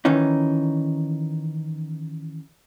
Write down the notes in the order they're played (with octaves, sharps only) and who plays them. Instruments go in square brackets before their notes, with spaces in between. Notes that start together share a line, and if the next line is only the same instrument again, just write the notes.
[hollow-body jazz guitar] D#3 E3 C#4 D#4